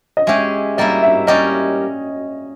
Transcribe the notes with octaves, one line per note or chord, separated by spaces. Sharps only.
D#5
G#3 C#4 G4 E5
G3 A#3 E4 D#5
E5
G3 C#4 G4 A#4 D#5